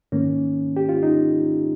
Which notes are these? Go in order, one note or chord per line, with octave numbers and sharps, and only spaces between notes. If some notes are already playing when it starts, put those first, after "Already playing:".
G#2 D#3 A#3 C#4
G4
F4
D#4